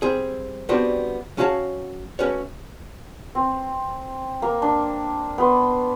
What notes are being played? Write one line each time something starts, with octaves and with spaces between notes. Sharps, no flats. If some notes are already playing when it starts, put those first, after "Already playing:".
G3 C4 G#4
G3 B3 C4 D4 F#4 G4
F#3 C#4 F#4 C#5 F5 A5
A3 C#4 F#4 B4 C#5
C4
A#3
D4
B3 C6